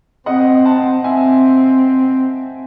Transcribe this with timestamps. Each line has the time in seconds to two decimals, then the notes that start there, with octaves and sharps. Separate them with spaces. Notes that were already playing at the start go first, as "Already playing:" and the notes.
0.26 C4 D#5 F#5
0.65 F#5 A5
1.04 C4 E5 G#5